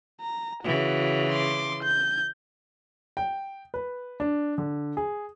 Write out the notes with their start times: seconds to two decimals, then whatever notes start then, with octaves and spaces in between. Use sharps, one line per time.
0.21 A#5
0.63 C#3 E3 F#4
1.32 C6 D6
1.83 G6
3.17 G5
3.74 B4
4.20 D4
4.58 D3
4.97 G#4